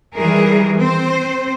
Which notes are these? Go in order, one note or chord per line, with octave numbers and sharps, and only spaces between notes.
D#3 E3 G3 G#4 A#4
C4 C5